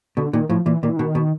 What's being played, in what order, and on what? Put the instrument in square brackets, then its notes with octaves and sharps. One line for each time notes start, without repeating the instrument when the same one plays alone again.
[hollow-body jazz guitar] B2 [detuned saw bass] D3
[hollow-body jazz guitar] A#2 [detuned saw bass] D#3
[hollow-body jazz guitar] A2 [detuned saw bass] F3
[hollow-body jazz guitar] A#2 [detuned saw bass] E3
[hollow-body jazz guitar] A#2 [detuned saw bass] D#3
[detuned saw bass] E3
[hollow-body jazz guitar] B2 [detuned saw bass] D#3
[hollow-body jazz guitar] B2